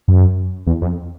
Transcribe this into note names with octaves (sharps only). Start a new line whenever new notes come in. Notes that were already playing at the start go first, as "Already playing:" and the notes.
F#2
E2
F2